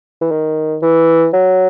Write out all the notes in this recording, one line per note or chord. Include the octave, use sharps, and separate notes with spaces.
E3
D#3
E3
F#3